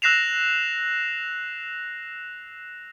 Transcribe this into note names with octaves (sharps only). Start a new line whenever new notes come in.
E6 F#6 A#6 C7 E7 F7